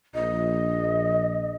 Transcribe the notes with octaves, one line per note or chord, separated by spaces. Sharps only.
A#1 D#5